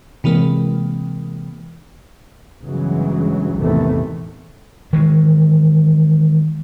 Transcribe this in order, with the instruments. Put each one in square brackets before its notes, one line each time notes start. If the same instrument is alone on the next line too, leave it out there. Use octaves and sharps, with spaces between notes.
[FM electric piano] C3 E3 G#3 A#3
[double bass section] G1 C#3 E3 F#3 G#3
A1 E2 C3 D#3 E3 A3
[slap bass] D#3 E3 G#3